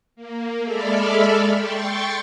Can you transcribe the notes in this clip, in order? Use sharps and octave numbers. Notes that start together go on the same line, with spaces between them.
A#3
G#3 A4 D5 E5 B5 F6
G5 C6 C#6 A6